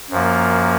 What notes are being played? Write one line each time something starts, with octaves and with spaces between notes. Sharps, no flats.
F#2 F3 A#3